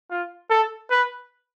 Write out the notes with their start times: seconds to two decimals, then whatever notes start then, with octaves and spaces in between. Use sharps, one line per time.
0.10 F4
0.50 A4
0.91 B4